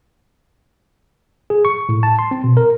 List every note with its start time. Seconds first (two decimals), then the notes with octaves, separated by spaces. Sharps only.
1.50 G#4
1.65 C#6
1.89 A2
2.03 A5
2.19 C6
2.31 C4
2.44 B2
2.57 A#4